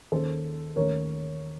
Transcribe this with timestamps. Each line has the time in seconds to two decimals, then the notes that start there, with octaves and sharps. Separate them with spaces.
0.12 D#2 D#3 A#3 C#4 A4 C5
0.76 D#2 D#3 A3 C#4 A#4 C#5